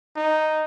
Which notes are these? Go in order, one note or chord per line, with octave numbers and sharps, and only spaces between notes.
D#4